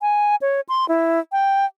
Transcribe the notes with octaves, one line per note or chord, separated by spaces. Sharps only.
G#5
C#5
C6
E4
G5